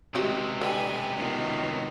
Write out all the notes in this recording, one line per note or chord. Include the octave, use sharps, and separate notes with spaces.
C#2 C3 D#3 G#3 C4 F#4 G4
D#4 G4 A4 B4 D5 G5 G#5
D#3 B3 F4 F#4